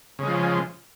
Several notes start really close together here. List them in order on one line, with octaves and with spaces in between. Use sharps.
C#3 G#3 F3